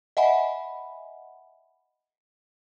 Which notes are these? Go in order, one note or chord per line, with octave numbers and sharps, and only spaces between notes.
D#5 E5 F#5 G#5 B5